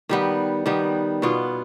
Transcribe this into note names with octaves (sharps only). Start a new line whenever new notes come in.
D#3 G3 B3
D#3 G3 B3
B2 B3 F4